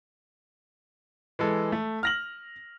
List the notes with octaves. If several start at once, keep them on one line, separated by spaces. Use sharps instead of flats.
E3 G#3 A4
A3
F6 A#6 F#7